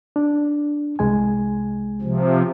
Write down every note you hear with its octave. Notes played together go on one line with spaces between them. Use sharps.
D4
C2 G#3 G#5
C3 F3